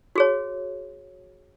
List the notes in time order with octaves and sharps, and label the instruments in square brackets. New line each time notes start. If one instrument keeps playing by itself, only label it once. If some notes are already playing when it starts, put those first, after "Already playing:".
[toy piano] F#4 G#4 C#5